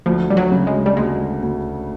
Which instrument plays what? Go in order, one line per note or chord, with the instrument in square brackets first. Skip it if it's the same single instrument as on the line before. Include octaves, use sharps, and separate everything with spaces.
[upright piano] D2 [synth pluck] F3
[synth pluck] G3
F#3
[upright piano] C#3
[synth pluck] G#3
G3
[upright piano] D2 [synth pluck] G#3
[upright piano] D2